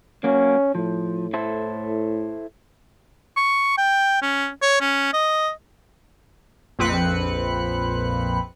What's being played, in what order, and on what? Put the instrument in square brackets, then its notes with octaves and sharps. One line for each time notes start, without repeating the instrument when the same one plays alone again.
[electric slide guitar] F#3 A#3 [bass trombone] C#4
[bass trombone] A2 [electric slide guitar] F3
[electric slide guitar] E4 A4 C5
[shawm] C#6
G5
C#4
C#5
C#4
D#5
[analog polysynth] A#1 F2 C4 B4 F#6 C#7